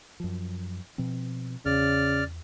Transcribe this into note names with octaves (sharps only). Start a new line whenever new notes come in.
F#2 F3
B2 F3 C4
E2 C#3 D5 F6